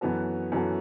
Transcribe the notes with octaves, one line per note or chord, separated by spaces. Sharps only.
F#2 E3 B3 F#4 A4
F#2 E3 B3 F#4 A4